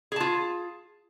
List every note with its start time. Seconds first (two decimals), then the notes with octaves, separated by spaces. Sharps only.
0.12 G#4
0.16 A5
0.20 F4